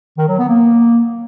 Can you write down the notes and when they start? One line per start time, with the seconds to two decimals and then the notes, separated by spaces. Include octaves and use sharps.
0.18 D#3
0.28 F#3
0.39 B3
0.49 A#3